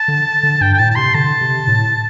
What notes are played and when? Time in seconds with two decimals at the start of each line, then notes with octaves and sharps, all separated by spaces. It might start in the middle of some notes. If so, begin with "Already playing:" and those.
Already playing: A5
0.08 D3
0.43 D3
0.61 G2 G5
0.74 G5
0.78 A2 A5
0.90 A5
0.96 C3 C6
1.14 D3 A5
1.41 C3
1.67 A2